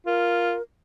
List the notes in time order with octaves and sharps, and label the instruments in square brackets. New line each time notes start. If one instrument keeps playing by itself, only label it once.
[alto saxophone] F4 [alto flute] A#4